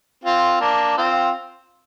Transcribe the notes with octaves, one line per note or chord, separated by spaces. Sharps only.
C4 F4
A#3 D4
C4 F4